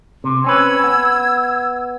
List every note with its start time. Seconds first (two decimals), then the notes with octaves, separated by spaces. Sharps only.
0.24 C3
0.44 C4 C#4 B4 E6 G#6
0.84 B3